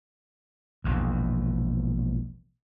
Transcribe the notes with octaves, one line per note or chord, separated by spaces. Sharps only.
E1 A#1 E2